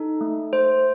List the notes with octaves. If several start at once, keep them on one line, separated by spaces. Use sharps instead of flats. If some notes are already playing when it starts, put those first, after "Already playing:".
Already playing: D#4 A4
A3
A3 C5